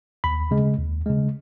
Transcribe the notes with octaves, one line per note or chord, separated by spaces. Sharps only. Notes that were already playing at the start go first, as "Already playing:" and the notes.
D#2 B5
C#3 G#3
D#2
C#3 G#3